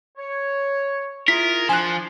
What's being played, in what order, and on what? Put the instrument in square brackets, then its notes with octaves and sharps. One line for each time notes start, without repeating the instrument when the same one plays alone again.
[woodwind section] C#5
[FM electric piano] E4 [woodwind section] F4 G#4 [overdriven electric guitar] A#4 [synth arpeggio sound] B6
[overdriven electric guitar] F3 [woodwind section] D4 [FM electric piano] G#5 F#6